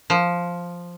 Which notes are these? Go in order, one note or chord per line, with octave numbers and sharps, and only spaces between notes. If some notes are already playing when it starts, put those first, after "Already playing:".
F3